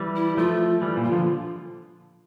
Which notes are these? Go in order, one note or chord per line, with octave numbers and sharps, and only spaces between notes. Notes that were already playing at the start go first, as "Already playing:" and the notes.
Already playing: E3 G3
E4
F3 A3 F4
E3 G3
A#2
F4
D3 F3